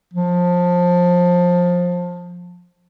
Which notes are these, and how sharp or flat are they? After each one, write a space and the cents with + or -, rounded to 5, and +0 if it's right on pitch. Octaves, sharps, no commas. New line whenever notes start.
F3 +20